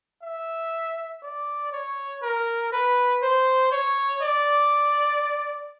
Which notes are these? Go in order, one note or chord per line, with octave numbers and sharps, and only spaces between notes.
E5
D5
C#5
A#4
B4
C5
C#5
D5